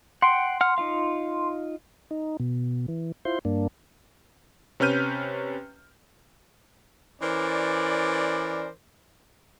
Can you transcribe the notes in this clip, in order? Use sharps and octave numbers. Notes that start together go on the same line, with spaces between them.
F#5 G5 C6
F#5 F6
D#4 F4 F5
D#4
B2
E3
E4 F4 C5 C6
G2 A#3 D4
C3 C#4 B4 F6 G6 D#7
E3 C#4 A#4 C5 D5